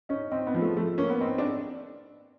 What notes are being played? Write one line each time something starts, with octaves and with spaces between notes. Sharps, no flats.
C#4 D#4
C4 D#4
B3
F3
A3
F3 A3
A#3 C#4
B3
C4 D#4
D4